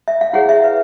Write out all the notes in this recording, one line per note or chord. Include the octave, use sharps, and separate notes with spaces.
E5
F5
E4 G#4 C#5 F#5
E5
B4